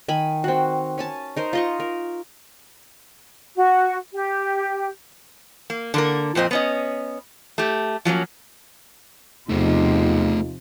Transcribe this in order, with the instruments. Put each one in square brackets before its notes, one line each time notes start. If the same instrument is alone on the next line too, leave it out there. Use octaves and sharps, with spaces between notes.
[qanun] D#3 G#5 B5
C4 F#4
C#4 G#5 A5
D#4 A#4 C5
F4 D#5 C#6
A#4
[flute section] F#4
G4
[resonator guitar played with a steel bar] A#3
D3 A#3 A#4
F2 A#2 C4 D#5
B3 C#4 D#5
A3 G4
F3 F#3 A#3 C#4
[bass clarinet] E2 [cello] C3 F3 [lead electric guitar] A3 C5 [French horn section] D#4 F4